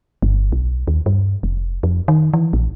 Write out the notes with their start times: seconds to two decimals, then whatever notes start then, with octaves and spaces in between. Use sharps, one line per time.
0.22 G1
0.52 B1
0.88 D#2
1.06 G2
1.43 F1
1.83 F2
2.08 D#3
2.34 E3
2.53 A#1